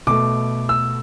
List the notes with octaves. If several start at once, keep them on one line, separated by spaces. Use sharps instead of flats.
B2 A3 D6
E6